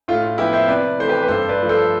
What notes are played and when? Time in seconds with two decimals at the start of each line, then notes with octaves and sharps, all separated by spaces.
0.08 A2 F4
0.23 F4
0.38 F3 B3 E4 G4
0.53 C5 E5
0.68 C3 B4 D5
0.99 E3 A3 C5
1.08 G4 B4
1.22 B4
1.28 G2 A4 C5
1.49 B4 D5
1.59 F3 A3
1.69 A4 C5